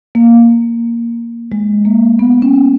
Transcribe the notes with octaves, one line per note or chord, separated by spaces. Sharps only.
A#3
G#3
A#3
B3
C#4